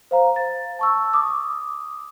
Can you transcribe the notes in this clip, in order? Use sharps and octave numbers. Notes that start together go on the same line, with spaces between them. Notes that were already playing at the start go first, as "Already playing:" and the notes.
C5 F5 A#5
A6
A5 C#6 E6
D6 D#6